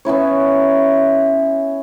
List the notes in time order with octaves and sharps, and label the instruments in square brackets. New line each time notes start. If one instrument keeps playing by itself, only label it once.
[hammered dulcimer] B3 C#4 E4 C#5